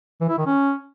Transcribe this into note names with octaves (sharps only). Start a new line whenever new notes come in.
E3
E4
D#3
C#4